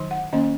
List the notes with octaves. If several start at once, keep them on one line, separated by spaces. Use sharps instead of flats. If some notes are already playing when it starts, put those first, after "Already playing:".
Already playing: D#3 F#3 D#4
F#5
D#3 A#3 C#4 D#5